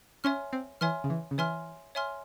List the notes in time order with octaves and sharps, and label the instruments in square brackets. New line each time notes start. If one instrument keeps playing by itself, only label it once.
[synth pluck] C#4 [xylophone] C#5 E5 G#5 C6 F6
[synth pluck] C4
[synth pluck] E3 [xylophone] C#5 E5 G#5 C6 F6
[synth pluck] C#3
E3
C#3
[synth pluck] E3 [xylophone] C#5 E5 G#5 C6 F6
[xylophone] C#5 E5 G#5 C6 F6